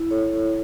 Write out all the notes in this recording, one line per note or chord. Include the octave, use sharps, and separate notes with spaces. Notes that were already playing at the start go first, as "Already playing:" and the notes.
Already playing: E4
A4 C#5